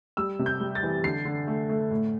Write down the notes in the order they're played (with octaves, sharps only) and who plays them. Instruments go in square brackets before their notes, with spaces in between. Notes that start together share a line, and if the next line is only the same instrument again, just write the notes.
[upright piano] G3 E6
C3
G6
G3
A6
E3
D3 C7
D3
A3
A3
A2